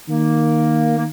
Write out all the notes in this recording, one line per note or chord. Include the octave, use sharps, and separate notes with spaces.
D#3 A#3
A#3